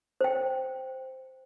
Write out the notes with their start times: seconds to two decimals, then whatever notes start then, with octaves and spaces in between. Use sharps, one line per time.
0.21 C5 G5